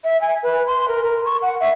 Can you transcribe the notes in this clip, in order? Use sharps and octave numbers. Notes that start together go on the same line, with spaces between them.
E5
G#5
B4
C6
A#4
A#4
C#6
F#5
E5